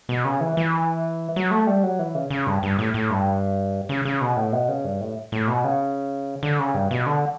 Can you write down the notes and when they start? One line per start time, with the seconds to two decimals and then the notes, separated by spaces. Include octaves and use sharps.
0.09 B2
0.25 C#3
0.41 E3
0.57 E3
1.36 F#3
1.51 A3
1.67 G3
1.83 F#3
1.99 E3
2.15 C#3
2.30 C#3
2.47 G2
2.63 G2
2.79 A2
2.94 A2
3.10 G2
3.89 C#3
4.05 C#3
4.21 B2
4.37 A2
4.52 B2
4.68 C#3
4.84 G2
5.01 A2
5.32 A2
5.48 B2
5.64 C#3
6.43 D3
6.59 C#3
6.74 G2
6.91 B2
7.06 D3